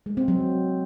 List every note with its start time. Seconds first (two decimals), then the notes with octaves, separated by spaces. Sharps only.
0.06 G#3
0.17 C4
0.28 F#3